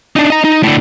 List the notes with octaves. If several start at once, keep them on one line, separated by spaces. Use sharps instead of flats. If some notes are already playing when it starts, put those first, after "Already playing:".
D4 D#4
D#5 A#5
D#4
A2 D3